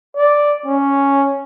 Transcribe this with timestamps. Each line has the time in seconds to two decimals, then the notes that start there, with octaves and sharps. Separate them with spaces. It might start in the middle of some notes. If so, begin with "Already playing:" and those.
0.16 D5
0.66 C#4